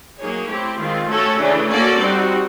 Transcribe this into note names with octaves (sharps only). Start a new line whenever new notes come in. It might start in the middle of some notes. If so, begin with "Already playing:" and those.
F#3 A#3 D#4 G#4 C#5
A3 C4 E4 G4
D#3 G#3 C4 F4
A3 C#4 F#4 A4 C#5
C#3 E3 A3 D4
A#3 C#4 F#4 A4 D5
G3 C4 D#4 F#4